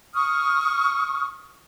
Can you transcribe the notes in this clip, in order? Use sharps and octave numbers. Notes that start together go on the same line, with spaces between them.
C#6 D#6 F6